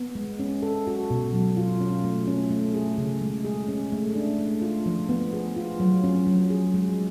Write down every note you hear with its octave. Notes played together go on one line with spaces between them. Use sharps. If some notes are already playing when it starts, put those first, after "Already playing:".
Already playing: B3
G#3
C#4
A4
F#4
B2
F#3
F4
C#4
A3
C#4
A3
G#4
C#3
G#3
G#4
C#4
A3
D4
A3
F4
F3
B3
G#4
F4
F#3
C#4
F#3
G#4
G#3